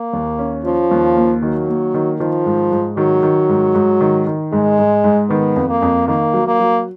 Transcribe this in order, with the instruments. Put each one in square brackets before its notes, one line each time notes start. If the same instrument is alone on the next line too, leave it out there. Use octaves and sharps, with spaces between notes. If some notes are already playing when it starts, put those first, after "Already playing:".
Already playing: [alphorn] A#3
[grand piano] D#2
C#4
[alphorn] F3 [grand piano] C#4
[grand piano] D#2
A#3
[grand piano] D#3 [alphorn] F#3
[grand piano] A#3
D#3
[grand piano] D#3 [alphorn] F3
[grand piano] G#2
G#2
[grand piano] D#3 [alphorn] F#3
[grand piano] D#3
G#2
G#2
D#3
D#3
[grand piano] G#2 [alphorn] G#3
[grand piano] G#2
G#2
[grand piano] D#3 [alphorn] B3
[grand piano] F2
[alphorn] A#3
[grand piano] F2
[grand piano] D#3 [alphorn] A#3
[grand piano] F#3
[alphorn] A#3
[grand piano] F#3